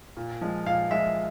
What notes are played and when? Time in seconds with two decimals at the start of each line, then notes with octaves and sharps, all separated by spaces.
0.17 A#2
0.41 F3 G#3
0.66 A#2 F5
0.91 F3 G#3 E5